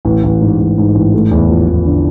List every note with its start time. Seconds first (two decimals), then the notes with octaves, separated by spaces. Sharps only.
0.05 A1
0.24 A1
0.41 G#2
0.59 A1
0.78 G#2
0.95 A1
1.14 A3
1.31 E2
1.49 F3
1.68 E2
1.85 D3